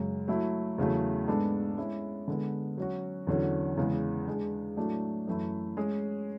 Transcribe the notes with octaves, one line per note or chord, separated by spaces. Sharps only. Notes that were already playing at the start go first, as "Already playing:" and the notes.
Already playing: F#2 C#3 G#3
F#3 A3 E4
E2 C#3 F#3 A3
G#2 G#3 B3 D4 A4
G#3 C#4 E4
D3 G#3 B3
F#3 C#4 F#4
E2 D3 F#3 C#4
E2 C#3 G#3
G#3 D4 G#4
A2 F#3 A3 D4
F#2 E3 A3 E4
G#3 C#4 G#4